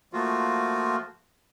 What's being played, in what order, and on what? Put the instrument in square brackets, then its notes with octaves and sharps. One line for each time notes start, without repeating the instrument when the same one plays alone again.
[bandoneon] F3 A3 A#3 F4 F#4